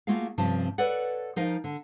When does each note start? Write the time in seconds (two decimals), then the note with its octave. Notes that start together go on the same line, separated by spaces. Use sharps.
0.07 A3 A#3 F4 F#4 G#4 F5
0.38 G2 C3 F3 C#4 A5
0.78 A4 B4 C#5 D5 F#5
1.36 F3 D#4 A#4 D#5 F5
1.64 D3